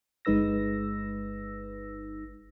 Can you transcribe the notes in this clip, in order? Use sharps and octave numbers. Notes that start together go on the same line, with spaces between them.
G1 G#3 D#4 B4 E6 A#6